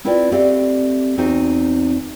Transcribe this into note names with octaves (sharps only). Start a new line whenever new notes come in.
C4 E4 F4 B4 D5 G5
A3 C4 G4 A4 D5 F5
E2 C4 D#4 F#4 C5 E5